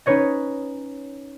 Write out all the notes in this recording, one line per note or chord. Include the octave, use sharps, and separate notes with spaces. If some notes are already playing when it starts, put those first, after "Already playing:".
C#4 D#4 B4 C#5 D#5